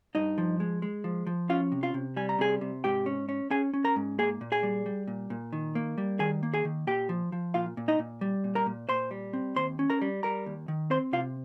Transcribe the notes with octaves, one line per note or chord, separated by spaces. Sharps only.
G2 D#4 D#5
F3
G#3
G#3
F3
F3
C#4 F4 F5
C3
F4 F5
C3
G3 G#5
A#5
C3 G#4 G#5
C3
G#2 G4 G5
C#4
C#4
C#4 G#4 G#5
C#4
A#4 A#5
G#2
A#3 G#4 G#5
A#2
G#4 G#5
G3
G3
A#2
A#2
D#3
A#3
G3
D#3 G#4 G#5
A#3
G#4 G#5
D#3
A#2 G4 G5
F3
F3
A#2 F4 F5
A#2
D#4 D#5
A#2
G3
A#2
A#4 A#5
A#2
A#2 C5 C6
G3
C4
D#2 C5 C6
C#4
A#4 A#5
G3
G3 A#4 A#5
D#2
D#3
C4 C5 C6
C3 F4 F5